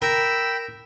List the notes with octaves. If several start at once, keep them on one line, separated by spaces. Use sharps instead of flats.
A#4 G5 B5 E6